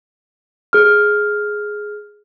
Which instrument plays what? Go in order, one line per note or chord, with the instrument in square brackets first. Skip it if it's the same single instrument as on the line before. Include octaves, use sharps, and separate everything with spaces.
[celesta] G#4 F6